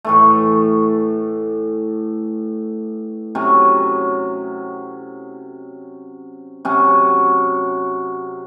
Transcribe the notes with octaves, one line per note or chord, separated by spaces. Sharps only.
A2 E3 A3
C3 F#3 C#4
C3 F#3 C#4 F#4